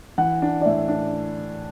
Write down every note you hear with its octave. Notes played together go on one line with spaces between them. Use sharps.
E3 F#5
D4
D5
A2 E5
D4